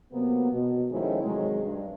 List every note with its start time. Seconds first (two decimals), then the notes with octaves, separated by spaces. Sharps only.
0.12 C3 F#3 A#3 B3
0.51 B2
0.91 D#3 F3 G#3 A3 C#4 E4
1.22 C3 D#3 F#3 G#3
1.63 G2